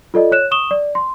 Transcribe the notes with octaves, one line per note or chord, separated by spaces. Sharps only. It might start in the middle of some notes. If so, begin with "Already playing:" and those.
F4 A4 D5 D#5
C#5 F#6 E7
C#6 D#6 E7 G7
D5
C6